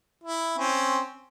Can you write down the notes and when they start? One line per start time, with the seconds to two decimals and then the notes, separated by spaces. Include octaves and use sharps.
0.23 E4
0.58 C4 C#4